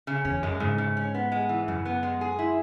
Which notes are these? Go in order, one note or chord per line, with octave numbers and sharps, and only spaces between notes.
C#3
E2 C#4
F#2 G#3
G#2 C#3
C#3
C#4
B3
G#3
E3
F#2 C#3
B3
G#3
G#4
E4